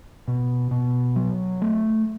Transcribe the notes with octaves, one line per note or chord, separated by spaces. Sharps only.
B2
B2
F#3
A3